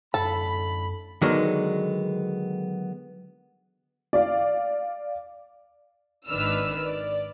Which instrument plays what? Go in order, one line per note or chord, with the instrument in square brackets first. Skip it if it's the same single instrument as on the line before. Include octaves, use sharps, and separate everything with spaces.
[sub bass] F#2 [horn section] A2 D3 B5 [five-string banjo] A4
[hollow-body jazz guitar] D3 D#3 F#3 G#3 B3
[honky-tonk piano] D5 F5
[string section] G#1 D#3 D4 B4 E6 F6
D5